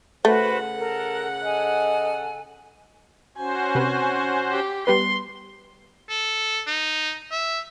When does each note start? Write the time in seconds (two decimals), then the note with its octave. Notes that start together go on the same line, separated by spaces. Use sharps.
0.25 C#3 A3 F#4 B4 C5 F#5
0.78 A4 A#4
1.44 A4 D#5 G#5
3.37 C#4 F#4 C5 G#5
3.75 C3 B4
4.51 G4
4.87 G3 B3 B4 C6
6.10 A4
6.67 D#4
7.31 E5